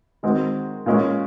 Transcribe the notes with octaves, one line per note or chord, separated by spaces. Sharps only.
D#3 G#3 C4 F#4
A#2 G#3 C#4